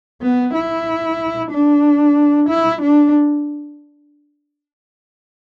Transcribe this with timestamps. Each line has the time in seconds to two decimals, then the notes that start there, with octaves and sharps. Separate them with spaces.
0.22 B3
0.54 E4
1.52 D4
2.49 E4
2.82 D4